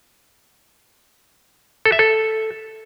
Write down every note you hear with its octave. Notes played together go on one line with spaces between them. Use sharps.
A4
E5
A4